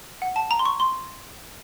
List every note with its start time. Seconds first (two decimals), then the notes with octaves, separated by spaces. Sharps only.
0.22 F#5
0.36 A5
0.51 A#5
0.59 C6
0.65 C#6
0.80 C6